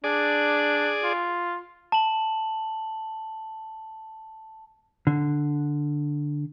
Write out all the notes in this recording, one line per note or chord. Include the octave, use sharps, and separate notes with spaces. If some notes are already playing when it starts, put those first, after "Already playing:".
D4 G#4 D5
F4
A5 F#7
D3